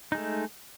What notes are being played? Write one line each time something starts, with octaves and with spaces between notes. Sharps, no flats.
G#3 A3 D#4